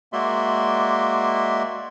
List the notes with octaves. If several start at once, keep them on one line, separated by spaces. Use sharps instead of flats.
G#3 A#3 F#4 D5 E5 C6